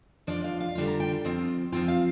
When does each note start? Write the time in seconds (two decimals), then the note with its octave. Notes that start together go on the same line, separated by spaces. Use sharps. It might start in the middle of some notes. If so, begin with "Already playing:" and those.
0.27 F3 D4 F4 D5
0.44 F5
0.60 F5
0.75 D3 G3 D4 F4
0.88 A#5
1.00 G5
1.24 F3 C4 F4
1.72 F3 C4 F4 G5
1.88 F5